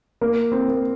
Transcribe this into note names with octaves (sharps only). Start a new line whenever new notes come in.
A#3
C4
A#3